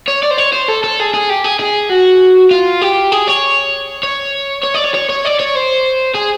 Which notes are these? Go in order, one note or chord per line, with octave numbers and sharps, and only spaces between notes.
C#5
D5
C5
C#5
C5
A4
A4
G#4
G#4
G4
G#4
G#4
F#4
F4
G4
G#4
C#5
C#5
C#5
D5
C#5
C#5
C#5
D5
C#5
C5
G#4